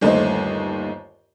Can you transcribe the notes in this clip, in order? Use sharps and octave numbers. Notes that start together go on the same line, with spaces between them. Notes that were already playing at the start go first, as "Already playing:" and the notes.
G1 D#2 A3 C5 D#5